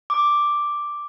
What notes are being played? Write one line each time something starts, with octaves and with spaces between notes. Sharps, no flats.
D6